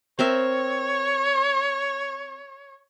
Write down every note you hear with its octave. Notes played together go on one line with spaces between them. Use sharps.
C4 A#4 C#5 E5